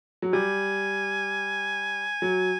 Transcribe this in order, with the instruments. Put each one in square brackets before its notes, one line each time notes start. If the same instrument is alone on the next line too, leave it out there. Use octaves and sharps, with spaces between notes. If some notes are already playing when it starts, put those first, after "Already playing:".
[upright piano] F#3
[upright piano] G3 [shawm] G#5
[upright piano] F#3